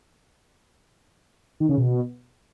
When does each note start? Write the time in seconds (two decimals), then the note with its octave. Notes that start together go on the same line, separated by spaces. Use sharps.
1.60 D#3
1.69 C#3
1.78 B2